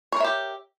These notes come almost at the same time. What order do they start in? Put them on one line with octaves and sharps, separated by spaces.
C#5 A#4 E5 G4